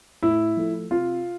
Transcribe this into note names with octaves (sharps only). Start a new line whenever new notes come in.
A2 E4
F3 A3
C3 F4